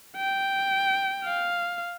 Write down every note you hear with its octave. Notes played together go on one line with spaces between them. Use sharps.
G5
F5